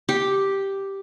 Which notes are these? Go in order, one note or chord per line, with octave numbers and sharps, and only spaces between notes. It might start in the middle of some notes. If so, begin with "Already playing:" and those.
G4